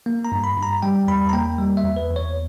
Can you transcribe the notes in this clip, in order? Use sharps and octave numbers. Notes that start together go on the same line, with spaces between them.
A#3
A#5
G2
B5
G2
A#5
G3 G5
E2 B5
A#5
A#3 G5
G3
E5
E2
B4
E2
C#5